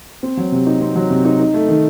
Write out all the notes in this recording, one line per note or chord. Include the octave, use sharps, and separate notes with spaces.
C4
F#3
C3
D#4
C4
F#3
C3
D#4
D#4
A3
D#3